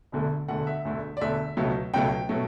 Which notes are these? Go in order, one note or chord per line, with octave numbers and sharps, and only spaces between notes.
E1 D2 D3 A3
E1 D2 D3 A3 F#5
E5
E1 D2 D3 A3
D5
E1 D2 D3 A3 E5
C#2 B2 F#3 A3
C#2 B2 F#3 A3 G5
B2 F#3 A3